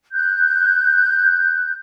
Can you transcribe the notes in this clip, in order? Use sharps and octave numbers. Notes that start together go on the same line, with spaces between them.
F#6 G6